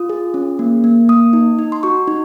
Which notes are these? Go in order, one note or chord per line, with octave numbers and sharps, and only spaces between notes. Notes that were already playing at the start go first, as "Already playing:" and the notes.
Already playing: F4 D#6
G#4
C#4
A#3
A#3
A#3 D#6
D#4
D#4
C6
F#4 C#6
D#4